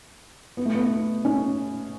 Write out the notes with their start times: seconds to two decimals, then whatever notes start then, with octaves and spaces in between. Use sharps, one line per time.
0.57 B3
0.65 A3
0.75 B3
1.25 C#4